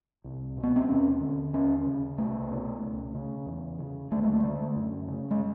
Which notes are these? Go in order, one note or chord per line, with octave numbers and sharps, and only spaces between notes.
C2
B2
B3
C4
D#2 C#4
D3
D#2 C#4
C#3
C2 A3
B2
C#2
C#3
E2
C#3
D2 A3
G#3
A3
D3
F#2
C#3
G#3